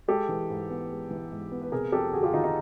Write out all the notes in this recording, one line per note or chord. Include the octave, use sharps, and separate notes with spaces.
G#3 G4 A4
E3
G#2
B3
G#3
E3
G#2
B3
B4
C3 G#4 A#4
F2 G4 A4
G1 F#4 G#4
F4 G4
D#3 D#4 F4
D#4 F4